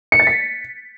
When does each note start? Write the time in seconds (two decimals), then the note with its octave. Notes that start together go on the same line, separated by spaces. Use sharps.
0.12 C#7
0.20 A6
0.27 B6